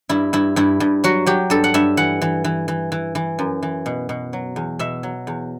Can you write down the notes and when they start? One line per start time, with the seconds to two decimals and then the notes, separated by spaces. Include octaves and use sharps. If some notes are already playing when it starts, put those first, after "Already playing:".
0.09 G2 E4
0.33 G2 E4
0.56 G2 E4
0.80 G2
1.04 F#3 F#4
1.26 F#3 G4
1.50 G2 A4
1.64 F#5
1.74 G2 E5
1.97 E3 F#5
2.22 E3
2.44 E3
2.68 E3
2.92 E3
3.15 E3
3.39 F#2
3.63 E3
3.86 B2
4.09 B2
4.33 F#3
4.56 E2
4.79 B2 E5
5.03 F#3
5.27 E2